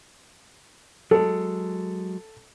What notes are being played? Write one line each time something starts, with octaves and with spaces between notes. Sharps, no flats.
F#3 G#3 A4